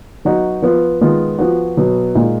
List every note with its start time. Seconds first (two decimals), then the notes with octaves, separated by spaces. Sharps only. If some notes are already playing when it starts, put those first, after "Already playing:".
0.25 F#3 B3 D#4 F#4
0.62 F3 B3 F4
1.01 D#3 G#3 B3 F4
1.39 F3 B3 F#4
1.77 B2 F#3 B3
2.15 A#2 G#3 D#4